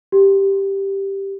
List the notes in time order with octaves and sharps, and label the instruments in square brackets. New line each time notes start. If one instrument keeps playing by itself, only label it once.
[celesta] G4